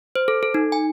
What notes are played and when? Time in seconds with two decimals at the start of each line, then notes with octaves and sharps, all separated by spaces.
0.15 C5
0.28 A4
0.43 A4
0.54 D#4
0.72 G#5